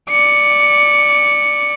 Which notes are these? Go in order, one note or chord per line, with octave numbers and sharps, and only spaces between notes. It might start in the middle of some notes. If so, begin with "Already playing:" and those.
D5 C#7